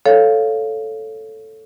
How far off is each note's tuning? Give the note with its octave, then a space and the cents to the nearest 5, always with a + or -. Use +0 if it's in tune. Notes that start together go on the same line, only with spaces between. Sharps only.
A4 +0 C#5 +0 F5 +0